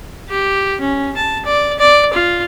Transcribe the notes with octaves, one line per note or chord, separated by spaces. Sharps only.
G4
C#4
A5
D5
D5
F4